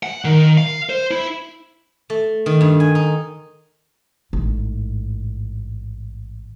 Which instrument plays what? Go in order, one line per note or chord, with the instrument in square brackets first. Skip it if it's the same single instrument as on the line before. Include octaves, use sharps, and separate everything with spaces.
[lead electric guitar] F#5
D#3
F5
C5
E4
[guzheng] A3
D#3
G2
G#5
D#4
[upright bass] A1 G#2